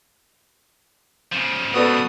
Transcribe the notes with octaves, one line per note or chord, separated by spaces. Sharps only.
C#3 F3
B3 F#4 A4 B4 D5 D#6